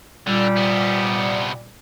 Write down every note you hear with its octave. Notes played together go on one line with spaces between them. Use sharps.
A#2 D3 G3
C3 B3